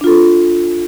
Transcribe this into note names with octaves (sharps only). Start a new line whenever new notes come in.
D4 F4 A4